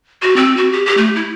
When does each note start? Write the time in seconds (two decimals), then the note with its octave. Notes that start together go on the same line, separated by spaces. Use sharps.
0.22 F#4
0.36 C4
0.57 F#4
0.72 G4
0.86 G4
0.97 A3
1.16 E4